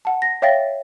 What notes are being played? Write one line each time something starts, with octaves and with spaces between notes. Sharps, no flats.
F#5 A5
A#6
C#5 E5 F5 G5 A6 A#6